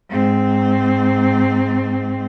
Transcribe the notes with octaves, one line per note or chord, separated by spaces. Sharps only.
G#2 C4